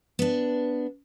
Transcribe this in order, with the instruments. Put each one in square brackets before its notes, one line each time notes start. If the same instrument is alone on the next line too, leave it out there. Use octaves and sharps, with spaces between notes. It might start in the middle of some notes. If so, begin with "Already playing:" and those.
[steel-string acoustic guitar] B3 D4